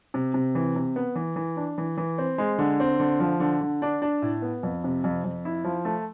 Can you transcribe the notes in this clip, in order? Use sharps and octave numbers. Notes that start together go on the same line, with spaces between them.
C3
C3
E3
C3
B3
E3
E3
D4
E3
E3
C4
G#3
D3
C4
D3
F3
D3
D3
D4
D4
A2
B3
F2
C3
F2
F2
E4
F3
A3